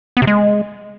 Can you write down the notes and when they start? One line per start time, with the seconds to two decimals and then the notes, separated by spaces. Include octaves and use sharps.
0.17 B3
0.22 C3
0.27 G#3